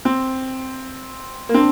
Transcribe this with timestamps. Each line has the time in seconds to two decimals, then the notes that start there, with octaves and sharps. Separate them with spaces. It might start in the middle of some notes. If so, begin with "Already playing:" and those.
0.05 C4
1.49 A#3
1.54 C4 D4